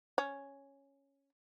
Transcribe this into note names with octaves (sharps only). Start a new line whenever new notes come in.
C#4